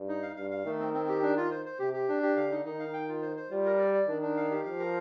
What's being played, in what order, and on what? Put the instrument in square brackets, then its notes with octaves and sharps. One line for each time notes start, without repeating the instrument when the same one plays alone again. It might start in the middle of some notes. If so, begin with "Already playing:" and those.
Already playing: [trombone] G2
[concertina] D#4
F5
[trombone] G2 [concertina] F5
[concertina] F5
[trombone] D#3 [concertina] A3
[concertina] C4
C4
G4
D4
F4
C5
C5
[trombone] C3 [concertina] G4
[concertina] G4
D4
G4
[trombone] D3 [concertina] F5
[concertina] D#4
[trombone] D#3 [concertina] D#4
[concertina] F5
G5
F4
C5
C5
[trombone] G3 [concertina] F4
[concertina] A#4
D5
D5
[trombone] D#3 [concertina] D4
[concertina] D4
F5
G4
[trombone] F3 [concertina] F5
[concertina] A#4